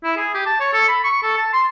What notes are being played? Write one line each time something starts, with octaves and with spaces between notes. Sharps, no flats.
E4
G#4
G4
A5
C#5
A4
B5
C#6
A4
A5
C6